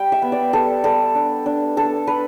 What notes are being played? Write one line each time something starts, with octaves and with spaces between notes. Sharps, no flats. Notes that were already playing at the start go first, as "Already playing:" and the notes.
Already playing: G3 G5
E5
B3
D5
G3 A4
G3 A4
D4
D4
D4 A4
D4 B4